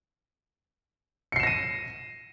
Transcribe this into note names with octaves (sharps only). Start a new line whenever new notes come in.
A#6 C7 C#7 D#7 E7